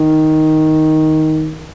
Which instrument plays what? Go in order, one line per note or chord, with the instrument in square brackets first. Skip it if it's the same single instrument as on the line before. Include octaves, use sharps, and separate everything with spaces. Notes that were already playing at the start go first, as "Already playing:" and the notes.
Already playing: [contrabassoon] D#3